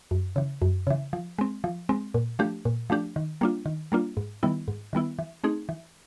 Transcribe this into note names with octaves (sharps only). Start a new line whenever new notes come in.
F#2
C#3 E3
F#2
C#3 E3
F3
G#3 C4
F3
G#3 C4
A#2
F3 A3 D4 G4
A#2
F3 A3 D4 G4
D#3
G3 A#3 D4 F4
D#3
G3 A#3 D4 F4
G#2
D#3 G3 B3 E4
G#2
D#3 G3 B3 E4
E3
A3 C4 D#4 G#4
E3